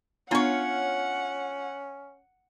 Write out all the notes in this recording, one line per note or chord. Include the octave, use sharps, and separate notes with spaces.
B3 C#4 D4 F4 C#5 F#5 A#5